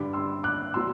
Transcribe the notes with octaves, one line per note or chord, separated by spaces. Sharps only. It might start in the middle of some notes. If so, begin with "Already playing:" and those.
Already playing: G2 D3 G3 B5 D6
C6 E6
D6 F#6
B2 F#3 C6 E6